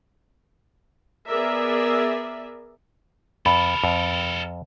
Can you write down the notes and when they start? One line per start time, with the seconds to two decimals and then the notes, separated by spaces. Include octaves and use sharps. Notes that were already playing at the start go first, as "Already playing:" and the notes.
1.27 B3 G#4 A#4 D5 E5
3.46 F2 A4 A#4 B5
3.84 F2